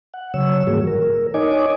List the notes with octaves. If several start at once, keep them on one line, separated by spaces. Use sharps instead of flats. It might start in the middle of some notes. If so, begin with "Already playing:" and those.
F#5
C#3 F#3 C#5 E6
G#2 E3 G3 A#3 F#4 G#4
A#4
D#4 C#5 D#5 G#5 D6